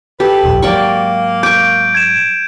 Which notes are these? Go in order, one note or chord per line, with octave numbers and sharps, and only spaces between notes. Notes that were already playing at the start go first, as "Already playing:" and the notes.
G4 A4 B4
D#1 A#1 F2
G#2 F#3 A#3 D5 G5 C#6
C#6 D6 G6 D7
G#6 E7